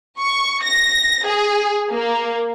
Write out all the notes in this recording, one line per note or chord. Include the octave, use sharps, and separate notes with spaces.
C#6
A#6
G#4
A#3